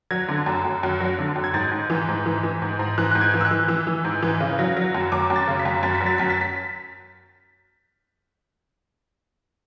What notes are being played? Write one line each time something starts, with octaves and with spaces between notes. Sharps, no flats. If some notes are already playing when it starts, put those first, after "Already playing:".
F#3 G#6
D3
F#2
F#2
F#2
F#3
D3
F#2
G#6
G#2 A6
G#2
E3
G#2
E3
E3
G#2
G#2
E3 F#6
G#2 F#6
G#6
E3
E6
F#6
E3
E3 E6
E3
G#2
E3
C#3
F#3
F#3
F#2
F#2 D6
F#2
A6
C#3
B6
F#2
F#2 A6
B6
F#3
A6
F#2 B6
A6
B6